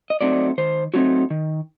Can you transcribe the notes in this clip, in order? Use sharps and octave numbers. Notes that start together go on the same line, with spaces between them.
D#5
F#3 A3 C4 D#4 D5
D#3 C5
F#3 A3 C4 D#4 F#4
D#3